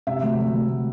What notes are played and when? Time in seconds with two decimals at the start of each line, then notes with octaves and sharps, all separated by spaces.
0.07 C3 E5
0.23 D2
0.38 D2
0.54 D2